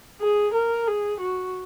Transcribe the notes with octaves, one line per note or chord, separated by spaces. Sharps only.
G#4
A#4
G#4
F#4